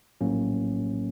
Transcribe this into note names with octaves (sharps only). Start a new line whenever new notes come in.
A#1 A2 F#3 A#3 C#4